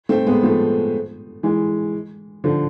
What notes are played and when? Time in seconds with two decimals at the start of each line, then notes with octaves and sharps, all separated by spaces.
0.09 A3 C4
0.26 G#3 B3
0.43 F3 A3
1.43 E3 G#3
2.44 D3 F3